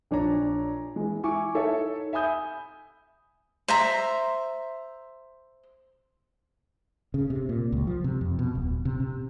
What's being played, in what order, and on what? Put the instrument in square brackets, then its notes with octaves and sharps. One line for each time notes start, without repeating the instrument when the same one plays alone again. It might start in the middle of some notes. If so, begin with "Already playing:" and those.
[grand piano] A#1 D4 C#5 A#5
E3 G#3
E4 G#5 C#6 D6
D#4 A4 C#5 D#5 E5
E5 G#5 B5 D#6 G6
[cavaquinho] C5 E5 A#5
[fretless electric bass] C#3
C3
A#2
C#2
F3
C3
F2
B2
D1
C3
C3